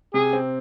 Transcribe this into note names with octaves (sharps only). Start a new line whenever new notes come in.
C3 G#4
C4